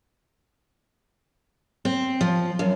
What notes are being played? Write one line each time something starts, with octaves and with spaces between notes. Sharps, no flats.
C4
F3
F#2